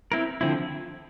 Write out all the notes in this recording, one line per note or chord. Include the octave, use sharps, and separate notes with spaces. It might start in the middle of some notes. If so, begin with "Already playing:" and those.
C4 E4 A#4
D3 F3 C4 E4